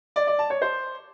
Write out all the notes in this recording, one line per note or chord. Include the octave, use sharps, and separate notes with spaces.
D5
D5
A5
C#5
C5